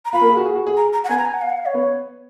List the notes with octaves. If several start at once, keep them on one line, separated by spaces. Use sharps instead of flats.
A#5
F4 F5 B5
A#3 A#4
G#4
F#4
G#4
F#4
G#4
A#5
A#5
F#5
B3 B4 G#5
A#5
G#5
F#5
F5
F#5
F5
C#5
B3 B4